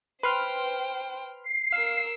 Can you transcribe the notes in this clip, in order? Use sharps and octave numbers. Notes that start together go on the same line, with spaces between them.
B4 C5 G5 C6 F6
C7
A#4 F5 E6